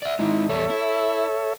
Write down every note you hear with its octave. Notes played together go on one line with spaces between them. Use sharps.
D5 E5
D#3 G#3 D#4 E4
E2 G3 A4 C#5 E5
E4